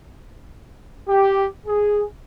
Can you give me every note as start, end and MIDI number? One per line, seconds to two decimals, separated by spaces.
1.08 1.44 67
1.67 2.02 68